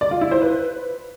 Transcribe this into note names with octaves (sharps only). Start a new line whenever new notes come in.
D5
F4
E4
C5
B4